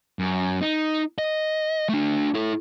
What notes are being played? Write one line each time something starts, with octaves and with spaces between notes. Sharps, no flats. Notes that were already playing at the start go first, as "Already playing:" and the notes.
F#2
D#4
D#5
A3 D4
E4 A4